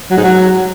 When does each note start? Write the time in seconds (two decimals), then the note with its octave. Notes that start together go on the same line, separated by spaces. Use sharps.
0.11 F#3
0.17 G#2
0.23 F#3